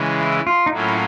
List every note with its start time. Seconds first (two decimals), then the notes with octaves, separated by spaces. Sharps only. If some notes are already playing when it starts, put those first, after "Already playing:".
Already playing: C#3 E3 G#3
0.20 E4
0.47 F4
0.66 D#4
0.72 A2 F#3 A#3 C#4 E4 F4